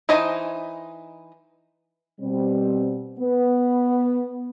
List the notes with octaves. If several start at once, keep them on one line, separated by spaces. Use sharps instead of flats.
E3 D#4 C5 D#5 G#5
B2 G3 C4
B3